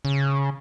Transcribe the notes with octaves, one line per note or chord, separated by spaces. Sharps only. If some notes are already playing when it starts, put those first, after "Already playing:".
C#3